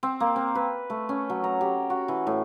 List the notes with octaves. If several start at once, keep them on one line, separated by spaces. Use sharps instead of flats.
C4
A#3
C4
B4
A3
C#4
F#3
A#5
G4
F#4
E3
A2